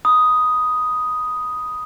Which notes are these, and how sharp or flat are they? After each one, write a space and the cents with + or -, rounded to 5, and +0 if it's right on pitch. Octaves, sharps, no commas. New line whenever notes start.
B5 +0 D#6 +0